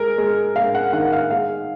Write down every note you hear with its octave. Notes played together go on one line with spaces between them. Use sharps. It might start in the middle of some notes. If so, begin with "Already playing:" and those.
Already playing: G#3 A#4
G#3
G#3 F5
F#5
D#3 F#5
F5
G#3 F5